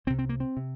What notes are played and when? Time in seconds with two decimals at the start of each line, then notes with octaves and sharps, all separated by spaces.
0.07 C2 C4
0.10 C3
0.19 C4
0.29 A#3
0.40 C4
0.57 C3